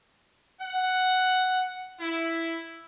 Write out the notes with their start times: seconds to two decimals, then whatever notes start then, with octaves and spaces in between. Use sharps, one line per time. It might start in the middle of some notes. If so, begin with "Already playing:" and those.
0.61 F#5
2.00 E4